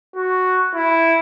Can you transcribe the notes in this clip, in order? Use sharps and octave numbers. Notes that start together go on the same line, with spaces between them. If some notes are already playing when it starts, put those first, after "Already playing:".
F#4
E4